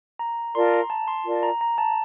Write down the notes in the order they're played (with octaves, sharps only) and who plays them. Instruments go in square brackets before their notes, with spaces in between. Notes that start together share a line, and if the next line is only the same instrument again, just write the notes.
[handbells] A#5
[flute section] F4 A#4 D5 A5 [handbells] C6
[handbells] A#5
A5
C6
[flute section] F4 A#4 D5 A5
[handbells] A#5
A#5
A5